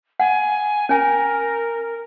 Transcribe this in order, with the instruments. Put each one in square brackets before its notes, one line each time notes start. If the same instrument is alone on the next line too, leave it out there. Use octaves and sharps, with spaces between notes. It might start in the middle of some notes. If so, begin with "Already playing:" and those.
[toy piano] F#5 [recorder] G#5
[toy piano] C#4 G#5 [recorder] A#4